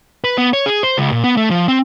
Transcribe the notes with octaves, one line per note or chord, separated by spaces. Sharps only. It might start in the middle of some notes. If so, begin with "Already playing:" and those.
B4
B3
C#5
G#4
C5
C#2
A#2
B3
A3
F3
C4